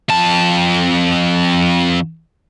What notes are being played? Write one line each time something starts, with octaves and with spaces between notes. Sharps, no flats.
F2 A5